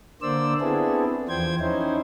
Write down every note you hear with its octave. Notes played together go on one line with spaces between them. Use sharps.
D3 A#3 C5 D5 E6
B3 C4 D4 E4 G#4 A4
E2 F3 C5 G5 G#6
C#4 D#4 E4 C5